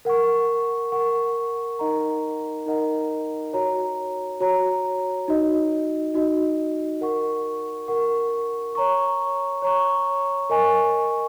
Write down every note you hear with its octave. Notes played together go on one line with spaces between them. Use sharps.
A#4 F#5 C#6
A#4 F#5 C#6
D#4 A#4 D#5 F#5 A#5
D#4 A#4 D#5 F#5 A#5
F#4 C#5 A#5
F#4 C#5 A#5
D#4 F#4 D#5
D#4 F#4 D#5
A#4 F#5 C#6
A#4 F#5 C#6
C#5 A#5 C#6
C#5 A#5 C#6
A#4 D#5 G#5 C#6